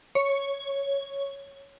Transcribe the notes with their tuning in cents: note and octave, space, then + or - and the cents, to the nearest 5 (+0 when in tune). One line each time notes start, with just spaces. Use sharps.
C#5 +0